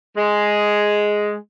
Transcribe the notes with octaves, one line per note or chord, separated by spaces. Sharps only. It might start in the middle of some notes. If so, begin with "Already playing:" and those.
G#3